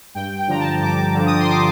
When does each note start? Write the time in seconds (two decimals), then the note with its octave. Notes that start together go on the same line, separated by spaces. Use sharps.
0.15 G2 G5
0.37 G5
0.48 D3 F3 A#5
0.59 A5
0.81 G2 D6
1.14 D3 F3
1.26 D#6
1.40 C6
1.49 D6